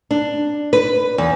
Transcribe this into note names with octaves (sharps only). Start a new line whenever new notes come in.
D4
B4
E2